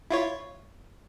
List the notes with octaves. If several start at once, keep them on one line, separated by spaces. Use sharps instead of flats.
E4 F4 C#5